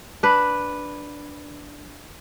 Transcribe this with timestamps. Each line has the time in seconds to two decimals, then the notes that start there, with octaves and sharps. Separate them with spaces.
0.23 D4 B4